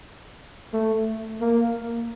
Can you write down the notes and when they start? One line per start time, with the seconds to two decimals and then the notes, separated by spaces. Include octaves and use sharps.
0.73 A3
1.41 A#3